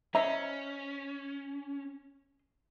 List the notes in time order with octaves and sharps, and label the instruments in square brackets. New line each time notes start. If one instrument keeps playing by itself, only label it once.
[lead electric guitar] C#4 [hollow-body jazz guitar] C5 D#5 A#5 [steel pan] E5